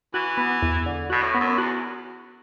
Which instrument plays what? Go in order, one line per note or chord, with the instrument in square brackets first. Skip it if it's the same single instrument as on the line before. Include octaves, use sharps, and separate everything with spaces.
[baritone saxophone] E3 [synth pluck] F#4
[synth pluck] B3
E2
D3
[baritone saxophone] B2 [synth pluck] F#4
[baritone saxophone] A2
[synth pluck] B3
[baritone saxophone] F#2
[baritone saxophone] E2 [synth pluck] F#4